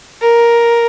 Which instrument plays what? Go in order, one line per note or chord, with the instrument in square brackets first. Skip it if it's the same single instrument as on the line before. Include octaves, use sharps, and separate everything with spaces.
[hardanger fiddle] A#4